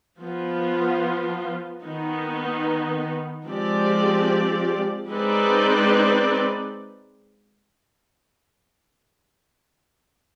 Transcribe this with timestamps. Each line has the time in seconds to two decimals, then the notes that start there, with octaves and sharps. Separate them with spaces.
0.19 F3 B3 F4
1.83 D#3 B3 D#4
3.45 F3 G#3 C4 G4 D5
5.08 G#3 C4 D#4 B4 D5